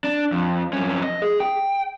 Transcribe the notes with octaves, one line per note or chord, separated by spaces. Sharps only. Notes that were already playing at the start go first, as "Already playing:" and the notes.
D4
F2
F2 C#4
D#5
G#4
G5